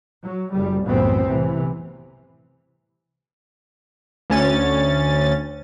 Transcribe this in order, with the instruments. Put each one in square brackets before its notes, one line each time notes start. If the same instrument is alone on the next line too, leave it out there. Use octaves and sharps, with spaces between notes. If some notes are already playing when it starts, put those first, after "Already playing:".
[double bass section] F#3
F#1 G3
C2 F#2 A2 E3 B3 C4
A2 C3 E3
[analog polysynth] D2 C#4 A6